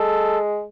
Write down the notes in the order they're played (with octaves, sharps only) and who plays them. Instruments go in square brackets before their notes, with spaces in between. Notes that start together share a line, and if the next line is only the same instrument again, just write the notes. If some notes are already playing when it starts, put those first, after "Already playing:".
Already playing: [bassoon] G#3 [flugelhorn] A4